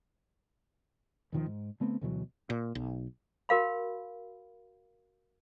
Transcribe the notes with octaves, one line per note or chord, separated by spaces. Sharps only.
D#2 B2 D#3 F3
G#2
D3 A3 B3 C4
D2 B2 E3 F#3
A#2
B1
F#4 A#4 F5 B5